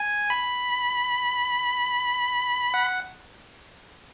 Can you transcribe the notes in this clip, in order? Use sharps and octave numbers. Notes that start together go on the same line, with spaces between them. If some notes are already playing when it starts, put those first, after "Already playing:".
Already playing: G#5
B5
F#5